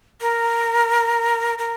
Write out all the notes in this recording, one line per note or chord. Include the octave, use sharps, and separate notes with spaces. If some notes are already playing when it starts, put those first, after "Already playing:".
A#4
A#4